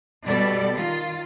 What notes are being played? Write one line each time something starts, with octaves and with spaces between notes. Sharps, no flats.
B2 G3 A4 D5
D#3 F4